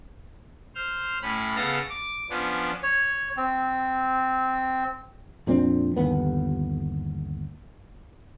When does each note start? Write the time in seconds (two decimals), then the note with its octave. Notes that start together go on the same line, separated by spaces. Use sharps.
0.75 C5 F6
1.22 A2 C#4 B5
1.56 C#3 B3 A4 F5 A#6
1.89 D6
2.30 F3 B3 C#4 D4
2.83 C#5
3.37 C4
5.47 F2 A#2 C4 D4
5.96 G1 D#2 B3